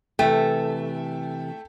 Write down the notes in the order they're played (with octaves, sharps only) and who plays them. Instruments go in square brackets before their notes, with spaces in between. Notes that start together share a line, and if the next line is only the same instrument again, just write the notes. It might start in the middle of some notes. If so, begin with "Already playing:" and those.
[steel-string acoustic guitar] C3 E3 [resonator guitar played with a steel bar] A3 [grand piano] A4 G5